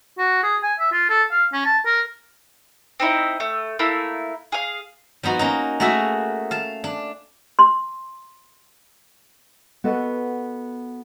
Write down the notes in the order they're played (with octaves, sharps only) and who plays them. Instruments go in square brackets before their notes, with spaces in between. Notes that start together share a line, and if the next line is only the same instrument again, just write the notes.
[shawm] F#4
G#4
G#5
E5
F4
A4
F5
C#4
A5
A#4
[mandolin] C4 D#4 E4 D#5
A3
A3 A#3 E4
G#4 F5
[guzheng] F3 B3 D#4 F#4
A#3 C#4 D#4
A3 A#3 F#4 G#4 E5 F5
F5 A5
D4
[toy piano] C6
[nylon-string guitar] B3 F#4 A4 D#5